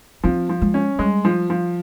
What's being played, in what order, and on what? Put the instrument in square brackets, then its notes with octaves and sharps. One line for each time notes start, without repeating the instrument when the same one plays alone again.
[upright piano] F3 [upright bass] C4
[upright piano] F3
[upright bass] G#3
[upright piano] C#4
[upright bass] G3 [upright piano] G#3
[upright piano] F3
F3